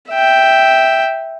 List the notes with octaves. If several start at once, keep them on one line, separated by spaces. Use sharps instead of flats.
E5 G5